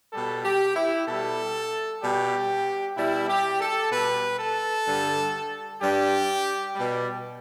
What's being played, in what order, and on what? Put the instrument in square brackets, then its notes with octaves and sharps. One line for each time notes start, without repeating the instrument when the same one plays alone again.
[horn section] B2 G3 A4
G4
E4
B2 G3 A4
B2 G3 G4
B2 G3 E4
G4
A4
B2 G3 B4
A4
G2 D3 G3
G2 G3 G4
B2 G3